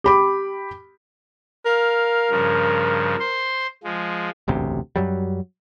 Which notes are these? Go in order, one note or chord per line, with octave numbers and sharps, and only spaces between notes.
G4 B5 D6
A#4 F5
G2 C#3 F3
C5 C6
F3 G#3
E1 A1 D2 C3
F#2 F#3 G3